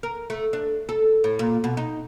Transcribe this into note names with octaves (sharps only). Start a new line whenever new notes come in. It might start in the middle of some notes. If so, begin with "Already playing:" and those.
A#4
A3
D4
A4
A2
A#2
B2
D#4